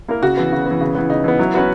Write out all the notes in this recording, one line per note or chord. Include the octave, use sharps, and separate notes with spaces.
A#3 E4 A#4
C#3 F#4
E3 B3
C#3
E3 B3
C#3
E3 B3
C#3 D#4
E3 B3
F#3 E4
E4
B3 C#4 F#4 B4